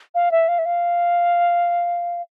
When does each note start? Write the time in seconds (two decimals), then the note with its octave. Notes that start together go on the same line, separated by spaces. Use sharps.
0.15 F5
0.32 E5
0.48 F5
0.59 E5
0.66 F5